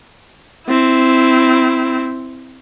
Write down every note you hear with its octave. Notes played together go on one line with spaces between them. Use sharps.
C4 E4